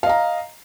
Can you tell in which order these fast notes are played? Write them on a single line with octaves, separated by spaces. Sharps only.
F5 D#5 A#5